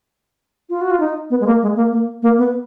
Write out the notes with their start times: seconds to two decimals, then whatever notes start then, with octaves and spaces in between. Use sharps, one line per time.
0.69 F4
0.81 F#4
0.91 F4
1.00 D#4
1.30 B3
1.40 G#3
1.46 A#3
1.62 G#3
1.76 A#3
1.91 A#3
2.22 A#3
2.38 B3